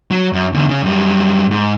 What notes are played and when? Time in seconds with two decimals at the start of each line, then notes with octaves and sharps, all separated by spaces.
0.11 F#3
0.33 F#2
0.52 E2 D3
0.69 C#3 C#4
0.83 F#2 G3
1.51 G#2